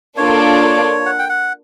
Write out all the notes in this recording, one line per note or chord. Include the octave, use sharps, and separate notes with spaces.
A#3 D4 F4 A4 C#5 D5
F#5
G5
F#5